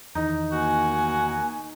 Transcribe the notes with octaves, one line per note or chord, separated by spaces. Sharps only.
E2 D#3 D#4
A#3 F#4 G#5